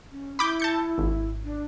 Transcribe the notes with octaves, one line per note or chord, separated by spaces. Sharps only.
C#4
E4 B5 D6 G6
A5 G6 C#7
G#1
D4